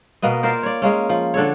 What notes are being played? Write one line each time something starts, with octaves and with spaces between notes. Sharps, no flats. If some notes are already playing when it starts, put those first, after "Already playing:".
B2 A#3 B3 D#5
F4 A#4 C5 D5
C#5 D5
G#3 A#3 C#4
F3
D3 D4 A4 C#5